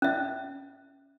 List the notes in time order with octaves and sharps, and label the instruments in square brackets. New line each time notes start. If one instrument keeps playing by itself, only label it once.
[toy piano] C#4 E5